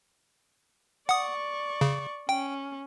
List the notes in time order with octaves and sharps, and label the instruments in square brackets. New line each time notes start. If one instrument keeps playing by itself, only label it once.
[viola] D5 C#6 [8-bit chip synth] F#5 D#6
[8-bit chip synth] C#3
[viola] C#4 [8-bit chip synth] G5